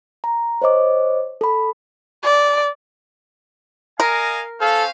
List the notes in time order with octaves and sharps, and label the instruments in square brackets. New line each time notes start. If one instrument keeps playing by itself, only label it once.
[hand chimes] A#5
C5 C#5 D#5 D6
A4 B5
[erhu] D5
[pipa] A#4 [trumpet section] D#5 F5 G#5
[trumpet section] C#4 C5 F5 [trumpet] A4